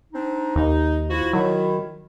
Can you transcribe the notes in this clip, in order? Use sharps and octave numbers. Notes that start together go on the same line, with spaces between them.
C4 D4 D#4
D#2 D#4
F3 E4 F#4
D#3 F#3 E4